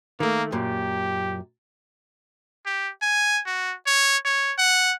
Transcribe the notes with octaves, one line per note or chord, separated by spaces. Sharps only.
D#3 A3 A#3
F#2 A#2 G4
G4
G#5
F#4
C#5
C#5
F#5